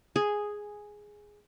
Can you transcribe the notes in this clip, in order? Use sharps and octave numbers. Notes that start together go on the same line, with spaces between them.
G#4